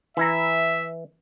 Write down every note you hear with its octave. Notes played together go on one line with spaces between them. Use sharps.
E3 E4 E5 A#5